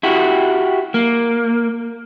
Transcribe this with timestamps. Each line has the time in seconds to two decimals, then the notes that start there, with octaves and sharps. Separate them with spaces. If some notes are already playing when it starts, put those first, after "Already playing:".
0.03 E4 F#4 G4
0.94 A#3